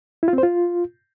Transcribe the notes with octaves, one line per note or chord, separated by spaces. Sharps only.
E4
F4
C4
C5
F4